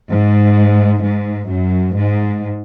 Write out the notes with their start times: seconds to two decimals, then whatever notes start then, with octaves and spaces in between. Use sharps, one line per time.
0.10 G#2
1.03 G#2
1.50 F#2
1.96 G#2